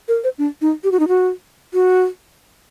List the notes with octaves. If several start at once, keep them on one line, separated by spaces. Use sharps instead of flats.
A#4
C5
D4
D#4
G4
F#4
D#4
F#4
F#4